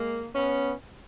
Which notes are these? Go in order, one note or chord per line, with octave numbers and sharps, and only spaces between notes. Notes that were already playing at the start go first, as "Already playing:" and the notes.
Already playing: G#3 A#3
B3 C#4